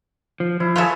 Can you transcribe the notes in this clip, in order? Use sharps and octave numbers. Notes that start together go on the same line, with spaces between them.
F3
F3 E4
F4 G#4 A4 B4 C#5 E5